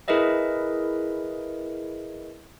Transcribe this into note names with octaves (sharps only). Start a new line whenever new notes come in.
E4 G#4 A#4 B4 D#5 E5